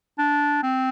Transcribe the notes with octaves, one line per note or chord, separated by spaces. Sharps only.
D4
C4